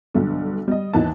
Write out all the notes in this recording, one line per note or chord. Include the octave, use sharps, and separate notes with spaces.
B1 G2 D3
G3 D#5
D#2 E3 D#4 A5